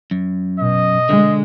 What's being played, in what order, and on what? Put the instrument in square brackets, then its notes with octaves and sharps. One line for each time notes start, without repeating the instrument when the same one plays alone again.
[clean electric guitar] F#2
[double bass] B2 [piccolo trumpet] D#5
[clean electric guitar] D3 [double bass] G#3